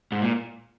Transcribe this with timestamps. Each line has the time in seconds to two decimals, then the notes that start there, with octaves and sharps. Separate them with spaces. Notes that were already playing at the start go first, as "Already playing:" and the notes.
0.12 G#2
0.21 A#2